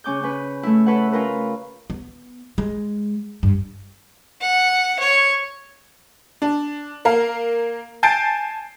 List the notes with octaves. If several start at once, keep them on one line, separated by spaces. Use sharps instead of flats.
C#3 C#4 D6 G6
C#4 B4
A3 E4
A4 B4 C#5 F#5
C#4 F4 A#4 B4
B3
G#3
G2
F#5
C#5
D4
A#3 A#4 F5
G#5 A5 G6 A6 C7 D7